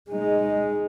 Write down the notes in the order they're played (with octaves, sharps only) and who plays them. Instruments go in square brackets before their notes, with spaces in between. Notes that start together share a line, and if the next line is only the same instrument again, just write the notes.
[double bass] G#3 D#4